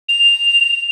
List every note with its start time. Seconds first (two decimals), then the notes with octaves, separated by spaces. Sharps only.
0.09 F7